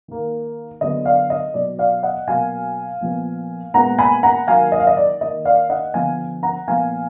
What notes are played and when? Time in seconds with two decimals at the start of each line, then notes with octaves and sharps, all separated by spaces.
0.08 D#3 A#3
0.81 D3 F#3 B3 D#5
1.05 D5 F5
1.30 D#5
1.54 B2 F#3 B3 D5
1.79 D5 F5
2.03 D#5 F#5
2.27 B2 F#3 A#3 F5 G#5
3.01 A#2 F3 B3
3.74 A#2 G#3 B3 F#5 A#5
3.99 G#5 B5
4.23 F#5 A#5
4.47 D#3 F#3 A#3 F5 G#5
4.72 D#5
4.80 F5
4.87 D#5
4.97 D5
5.21 D#3 A#3 D#5
5.45 D5 F5
5.70 D#5 F#5
5.94 D3 F3 B3 F5 G#5
6.43 F#5 A#5
6.68 A#2 F3 B3 F5 G#5